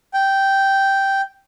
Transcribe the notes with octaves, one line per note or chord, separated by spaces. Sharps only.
G5